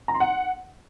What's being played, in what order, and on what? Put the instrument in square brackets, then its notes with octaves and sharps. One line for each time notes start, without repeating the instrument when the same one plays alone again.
[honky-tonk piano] A#5
C6
F#5